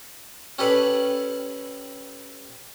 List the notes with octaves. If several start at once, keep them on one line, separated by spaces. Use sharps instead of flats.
C#4 G4 A4 B4 D5